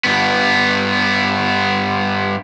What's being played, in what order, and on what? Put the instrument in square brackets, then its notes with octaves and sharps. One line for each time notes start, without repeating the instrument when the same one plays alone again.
[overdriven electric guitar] G2 B3